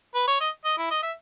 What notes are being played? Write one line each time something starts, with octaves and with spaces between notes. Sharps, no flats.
B4
C#5
D#5
D#5
E4
D#5
E5